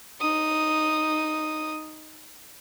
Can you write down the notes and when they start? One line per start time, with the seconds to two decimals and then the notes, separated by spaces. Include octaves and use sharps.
0.20 D#4 D#6